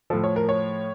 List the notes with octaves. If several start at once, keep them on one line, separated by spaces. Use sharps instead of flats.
A2 F3 A4
C#5
A#4
C#5